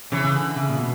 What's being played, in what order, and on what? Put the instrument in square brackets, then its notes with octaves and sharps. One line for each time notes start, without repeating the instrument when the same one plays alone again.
[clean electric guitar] C#3 [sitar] E3
[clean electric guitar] C#3
D3
C#3
A#2
B2